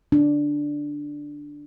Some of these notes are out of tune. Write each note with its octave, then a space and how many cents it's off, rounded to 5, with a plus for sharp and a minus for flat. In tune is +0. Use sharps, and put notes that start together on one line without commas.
D4 +0